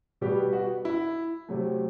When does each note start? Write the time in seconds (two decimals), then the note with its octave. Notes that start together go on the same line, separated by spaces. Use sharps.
0.21 B2 G3 B3 G4
0.53 F#4
0.85 E4
1.49 C3 F#3 A3